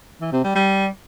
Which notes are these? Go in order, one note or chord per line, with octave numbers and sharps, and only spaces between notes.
E3
C3
G3
G3